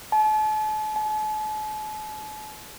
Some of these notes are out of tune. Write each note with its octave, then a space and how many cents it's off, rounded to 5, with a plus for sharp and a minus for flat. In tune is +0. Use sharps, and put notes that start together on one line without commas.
A5 -40
A5 -45